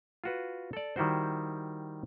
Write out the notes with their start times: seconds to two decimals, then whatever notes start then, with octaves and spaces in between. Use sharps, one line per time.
0.24 F4 F#4 B4
0.73 A4 D5
0.96 D#3 G3 E4 F#4 C5